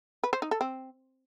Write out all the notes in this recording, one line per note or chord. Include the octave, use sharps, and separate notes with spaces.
B4
C5
D#4
A4
C4